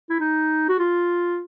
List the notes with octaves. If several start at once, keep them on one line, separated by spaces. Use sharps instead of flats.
E4
D#4
F#4
F4